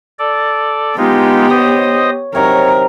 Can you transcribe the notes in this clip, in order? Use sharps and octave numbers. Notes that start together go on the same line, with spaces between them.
A4 D5
G#3 B3 D#4 F4 G4
C5 C#5 D#5 D#6
C3 F#3 D#4 A#4 C#5